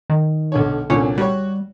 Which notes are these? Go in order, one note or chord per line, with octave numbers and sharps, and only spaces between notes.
D#3
B1 D3 C#5
C2 A#2 D3 C#4
G3 F#4 C#5